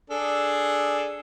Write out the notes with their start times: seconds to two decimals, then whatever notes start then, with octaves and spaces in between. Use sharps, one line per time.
0.10 D4 G#4 A4